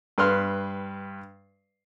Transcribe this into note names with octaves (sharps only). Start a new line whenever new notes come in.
G2 B4 C6 F6